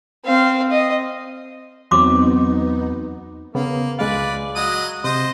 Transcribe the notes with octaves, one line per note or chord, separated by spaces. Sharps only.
C4 F5
D#5
E2 F#3 B3 C4 D#4 C6 D6
C#3 A#3 B3
C#2 G#3 B4 D5 F5
F#3 D#5 D#6
C3 C5 D#5